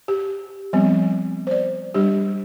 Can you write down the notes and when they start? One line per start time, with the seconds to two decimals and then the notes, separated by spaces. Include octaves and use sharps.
0.08 G4
0.73 F3 G3 B3 C4
1.47 C5 D5
1.94 G3 D4 G4